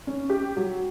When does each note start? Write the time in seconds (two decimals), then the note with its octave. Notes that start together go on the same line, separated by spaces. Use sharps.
0.07 C#4
0.30 G4
0.57 F#3